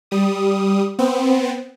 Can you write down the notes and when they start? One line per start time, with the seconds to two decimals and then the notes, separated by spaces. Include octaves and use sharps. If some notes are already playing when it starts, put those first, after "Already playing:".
0.11 G3 D#6
0.99 B3 C4